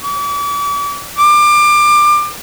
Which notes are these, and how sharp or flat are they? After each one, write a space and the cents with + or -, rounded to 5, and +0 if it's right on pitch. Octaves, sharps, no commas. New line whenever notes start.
D6 -40
D6 +25